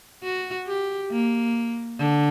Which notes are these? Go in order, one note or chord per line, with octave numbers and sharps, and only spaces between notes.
F#4
G4
A#3
D3